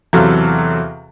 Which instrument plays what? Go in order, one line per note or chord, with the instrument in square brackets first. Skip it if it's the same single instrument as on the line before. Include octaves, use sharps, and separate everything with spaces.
[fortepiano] E2 C3 F#3 A4 F5